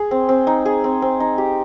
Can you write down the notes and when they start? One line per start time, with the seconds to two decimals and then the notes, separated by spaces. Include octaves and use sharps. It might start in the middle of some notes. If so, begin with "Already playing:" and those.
Already playing: G#4
0.11 C4
0.29 C4
0.47 D#4
0.65 G#4
0.84 C4
1.02 C4
1.20 D#4
1.38 G4